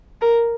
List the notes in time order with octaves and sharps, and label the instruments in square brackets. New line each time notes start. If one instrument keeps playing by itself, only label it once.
[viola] A#4